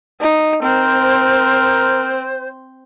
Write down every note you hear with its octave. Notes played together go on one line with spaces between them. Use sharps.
D#4
C4 A#4 C5 F6